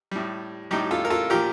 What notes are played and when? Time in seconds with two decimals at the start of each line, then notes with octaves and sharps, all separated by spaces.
0.11 A2 G3
0.71 A2 G3 D#4 G4
0.91 F4 A4
1.05 A#4
1.10 F4 A4
1.30 A#2 F3 G4 A#4